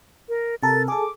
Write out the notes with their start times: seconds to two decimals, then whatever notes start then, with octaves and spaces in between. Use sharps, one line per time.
0.29 A#4
0.63 C3 A4 A#4 A6
0.88 G#4 A4 D6